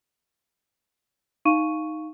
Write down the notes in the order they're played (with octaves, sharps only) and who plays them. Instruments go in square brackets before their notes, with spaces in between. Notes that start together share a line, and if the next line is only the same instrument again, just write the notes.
[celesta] D#4 F5 C#6 D#7